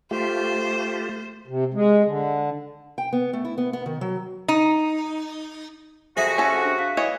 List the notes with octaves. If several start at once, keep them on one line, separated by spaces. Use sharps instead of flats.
A3 F4 G4 C5
C3
G#3
D3
G5
B3
A3
E4
B3
B3
D#3
F#3
D#4
F2 C3 F#4 G#4 E5 G#5 A#6
C#4 A4
D4 F#6
F5 F#6 B6
E3 C#5 D#5